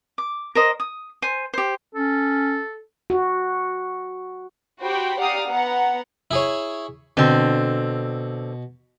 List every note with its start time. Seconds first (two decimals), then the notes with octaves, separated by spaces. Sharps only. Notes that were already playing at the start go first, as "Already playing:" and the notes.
0.18 D6
0.55 A#4 C5 D#5
0.80 D#6
1.22 C5 G#5
1.54 G4 C5
1.95 C#4 A4
3.10 F#4
4.81 F#4 G4 C5 G5 B5
5.20 G4 D5 F5 F#5 A#5 D#6
5.49 B3 F#5 A#5
6.31 E4 G#4 C#5
7.17 B2 D3 C4